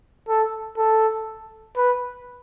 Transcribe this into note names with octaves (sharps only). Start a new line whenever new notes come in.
A4
A4
B4